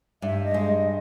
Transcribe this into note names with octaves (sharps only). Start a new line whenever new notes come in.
G2 E5
D#5
G#3